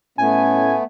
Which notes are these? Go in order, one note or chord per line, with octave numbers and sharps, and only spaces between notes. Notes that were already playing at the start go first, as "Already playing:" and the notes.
A2 A3 B3 C#4 G#5